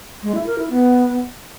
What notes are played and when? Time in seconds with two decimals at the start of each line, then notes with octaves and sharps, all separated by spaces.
0.23 G#3
0.35 E4
0.46 A#4
0.58 E4
0.70 B3